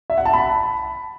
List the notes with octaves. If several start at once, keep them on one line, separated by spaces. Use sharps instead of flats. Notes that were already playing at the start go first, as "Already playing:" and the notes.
E5
F#5
A5
B5